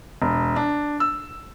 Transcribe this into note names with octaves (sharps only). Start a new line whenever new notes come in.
E1
D4
E6